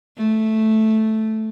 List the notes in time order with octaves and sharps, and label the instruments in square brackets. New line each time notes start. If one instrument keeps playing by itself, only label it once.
[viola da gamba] A3